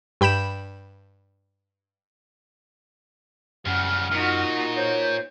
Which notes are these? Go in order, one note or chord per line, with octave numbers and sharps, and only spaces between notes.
G2 G5 B5 G6 E7
C2 F#2 C#3 F#5 F6
A#2 D#4 F#4
C5 C#5 G6